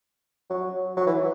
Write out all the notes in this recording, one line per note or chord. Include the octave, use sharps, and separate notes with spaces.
F#3
F#3
E3